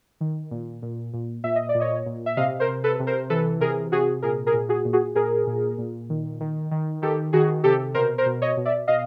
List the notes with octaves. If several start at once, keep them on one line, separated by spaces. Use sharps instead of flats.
D#3
A#2
A#2
A#2
A#2 E5
D#5
D5
A#2
C#5 D#5
A#2
E5
C3 D#5 F5
A#4 C5
C3
A4 B4
C3
A#4 C5
E3 A4 B4
C3 G#4 A#4
C3 F#4 G#4
A#2 G#4 A#4
G#4 A#4
A#2
F#4 G#4
A#2
F#4 G#4
A#2 G#4 A#4
A#2
A#2
D#3
D#3
D#3
D#3 G4 A4
D#3 F#4 G#4
C3 G4 A4
B2 A#4 C5
A#4 C5
B2
C#5 D#5
B2
D5 E5
B2 D#5 F5